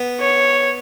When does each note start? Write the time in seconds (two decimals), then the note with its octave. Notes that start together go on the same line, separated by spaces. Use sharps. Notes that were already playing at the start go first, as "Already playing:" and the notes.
Already playing: B3
0.20 C#5